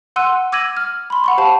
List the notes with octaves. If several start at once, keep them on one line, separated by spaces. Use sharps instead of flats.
F#5 C6 E6 F#6 D#7
D6 E6 G#6 A#6 D#7 F#7
F6
B5 C6
F#5 B5 C#6
G4 C5 F5 A5 B5